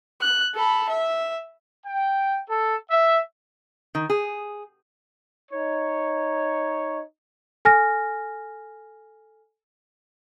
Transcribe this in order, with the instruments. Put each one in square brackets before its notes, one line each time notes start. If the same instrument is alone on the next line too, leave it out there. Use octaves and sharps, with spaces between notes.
[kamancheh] F#6
A4 B5
E5
[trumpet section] G5
A4
E5
[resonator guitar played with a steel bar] D#3
G#4
[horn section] D#4 C#5
[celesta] A4 G#5 F6 A#6